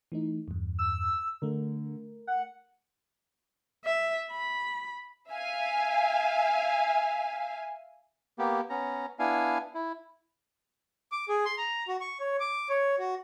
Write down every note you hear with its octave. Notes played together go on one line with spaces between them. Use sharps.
E3 A3 D#4
E2 G2
E6
D3 A3 A#4
F#5
E5
B5
E5 F5 G#5
A#3 B3 G4
B3 C#4 A#5
B3 D4 E4 F5 G#5
E4
D6
G#4
C6
A#5
F#4
C#6
C#5
D6
C#5
F#4